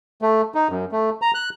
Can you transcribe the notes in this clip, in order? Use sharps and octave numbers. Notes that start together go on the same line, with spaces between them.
A3
D#4
F#2
A3
A#5
F#6